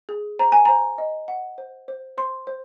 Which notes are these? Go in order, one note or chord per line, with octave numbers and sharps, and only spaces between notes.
G#4
C5 A#5
G#5
C5 A#5
D#5
F#5
C5
C5
C5 C6
C5